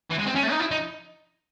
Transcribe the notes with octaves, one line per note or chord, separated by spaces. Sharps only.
E3
G#3
C4
C#4
A3
D#4
E4
D#4